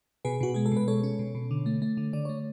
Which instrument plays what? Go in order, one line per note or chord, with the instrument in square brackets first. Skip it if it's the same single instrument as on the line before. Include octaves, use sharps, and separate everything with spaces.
[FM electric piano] B2 G#4 B4
B2 F#4
G#3 G#4
A4
B2 B4
G#3 A4 C#5
C#4
B2
B2
D3
A3
A3
D3
D3 D5
A3 C#5